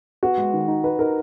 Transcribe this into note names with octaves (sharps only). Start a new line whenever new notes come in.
B3 F#4
G#3
D#3
D#4
D#4 B4
D#4 A#4